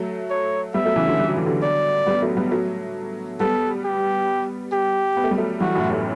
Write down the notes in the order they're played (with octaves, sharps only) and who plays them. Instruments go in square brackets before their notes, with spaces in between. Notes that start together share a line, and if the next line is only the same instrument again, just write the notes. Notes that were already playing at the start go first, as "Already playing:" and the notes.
Already playing: [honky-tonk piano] F#3 A3
[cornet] C#5
[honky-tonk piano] G3 B3 [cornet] E5
[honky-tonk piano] F#3 A3
C#3 E3
D3 F#3
G3
F#3
E3
D3 F#3
[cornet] D5
[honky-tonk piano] G3 B3
F#3 A3
G3 B3
F#3 A3
[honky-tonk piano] G3 B3 [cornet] A4
[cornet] G4
G4
[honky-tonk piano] B3
A3
G3
F#3 A3
[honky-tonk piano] E3 G3 [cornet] F#4
[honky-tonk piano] F#2 A2
A2